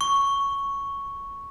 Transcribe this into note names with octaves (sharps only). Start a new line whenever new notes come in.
C#6